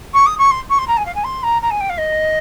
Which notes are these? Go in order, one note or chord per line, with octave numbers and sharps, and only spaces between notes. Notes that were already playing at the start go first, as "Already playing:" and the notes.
C#6
D#6
C#6
C6
C#6
C6
A#5
G#5
F5
G#5
C6
A#5
A#5
G#5
G5
F5
D#5